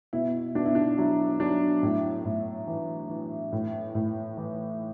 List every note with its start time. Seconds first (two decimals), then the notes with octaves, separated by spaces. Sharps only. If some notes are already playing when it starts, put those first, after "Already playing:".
0.13 B2 E4
0.55 B2 D4
0.65 E4
0.75 D4
0.98 F#3 E4
1.40 F#3 D4
1.83 A2 E4
2.25 A2
2.68 E3
3.10 E3
3.53 A2
3.95 A2
4.37 E3